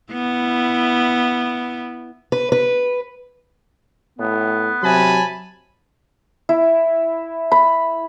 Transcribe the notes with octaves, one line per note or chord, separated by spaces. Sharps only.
B3 E4
B4
B4
A2 B3
C3 F#3 G#5 A5 B5
E4
B5